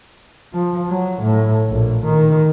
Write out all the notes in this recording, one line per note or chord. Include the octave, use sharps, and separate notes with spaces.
F3
F#3
A2
A#1
D#3